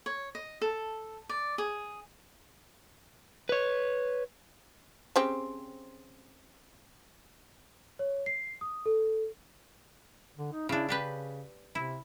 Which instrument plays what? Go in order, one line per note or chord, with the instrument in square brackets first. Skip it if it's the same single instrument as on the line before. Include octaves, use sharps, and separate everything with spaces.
[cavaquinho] C#5
D#5
A4
D5
G#4
[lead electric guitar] B4 C#5
[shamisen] C#3 C4 G4
[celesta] C#5
C7
D#6
A4
[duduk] D3
D#4
[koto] C#3 D4 [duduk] E4
[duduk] C#3 [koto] D4 G4 B4
[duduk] C3 [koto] E4